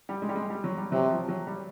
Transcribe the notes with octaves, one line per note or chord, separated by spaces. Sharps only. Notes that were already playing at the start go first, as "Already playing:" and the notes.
G3
G#3
G3
G#3
G3
F#3
G3
C3 F#3
F3
F#3
G3